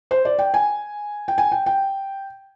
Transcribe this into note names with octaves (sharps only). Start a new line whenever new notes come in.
C5
D5
G5
G#5
G5
G#5
G5
G5